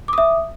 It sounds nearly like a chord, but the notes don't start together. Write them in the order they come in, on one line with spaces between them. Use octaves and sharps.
D6 D#6 E5